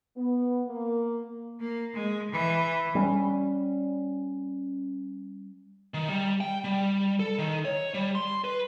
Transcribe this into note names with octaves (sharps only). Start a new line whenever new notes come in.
B3
A#3
A#3
G#3
E3
G3 C4 C#4
D#3
G3
G5
G3
A4
D#3
C#5
G3
C6
B4